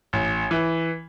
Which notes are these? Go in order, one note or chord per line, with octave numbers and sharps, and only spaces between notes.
A1
E3